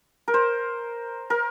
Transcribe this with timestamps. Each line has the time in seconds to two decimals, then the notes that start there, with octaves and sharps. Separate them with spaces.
0.28 A#4
0.34 C5
1.30 A#4